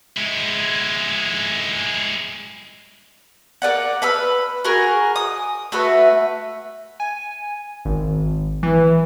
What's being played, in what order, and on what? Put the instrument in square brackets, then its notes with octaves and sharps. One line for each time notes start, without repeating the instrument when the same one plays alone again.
[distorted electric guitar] G#3 E4
[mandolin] A#4 B4 D5 F#5
B4 B5 E6 F6
F#4 G#4 A#4 G#5
D#6
A3 F#4 B4 E5
[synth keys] G#5
G#1
E3